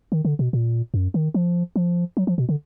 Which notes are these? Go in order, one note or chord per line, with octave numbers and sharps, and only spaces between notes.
D#3
D3
B2
A#2
F#2
D#3
F3
F3
F#3
F3
B2
D3